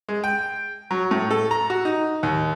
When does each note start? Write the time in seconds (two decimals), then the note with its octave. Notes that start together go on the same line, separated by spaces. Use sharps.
0.09 G#3
0.24 G5
0.91 F#3
1.11 A2
1.31 A4
1.51 A#5
1.70 F#4
1.85 D#4
2.23 D#2